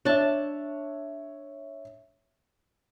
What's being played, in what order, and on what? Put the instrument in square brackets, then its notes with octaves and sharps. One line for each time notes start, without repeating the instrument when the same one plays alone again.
[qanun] D4 A5 [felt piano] C#5 E5